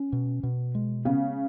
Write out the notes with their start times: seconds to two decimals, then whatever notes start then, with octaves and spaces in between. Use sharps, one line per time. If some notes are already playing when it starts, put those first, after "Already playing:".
Already playing: C#4
0.12 B2
0.43 B2
0.75 G#3
1.05 C#3 B3